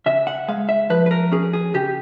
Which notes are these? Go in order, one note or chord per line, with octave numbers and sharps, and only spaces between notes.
C#3 E5
F#5
G#3 F5
E5
F3 B4
B4
A#4
C#4 G#4
G#4
C#3 G4